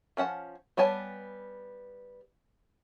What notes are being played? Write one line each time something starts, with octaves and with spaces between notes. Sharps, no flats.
F3 C#4 F#5 A5
G3 B3 C#5 G#5 A5